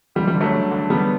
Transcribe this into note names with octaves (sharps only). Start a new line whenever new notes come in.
D2 G3
G3
D3
F#3 A3
D3
D3
D3 G3 B3